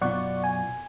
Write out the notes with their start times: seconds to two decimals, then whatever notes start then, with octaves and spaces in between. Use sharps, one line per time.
0.01 F#2 B2 F4 D5 F#5 C#6
0.44 G#5